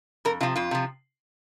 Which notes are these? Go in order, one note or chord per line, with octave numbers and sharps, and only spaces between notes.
F2 A#4
C3 F3 F4
F2 F4
C3 F3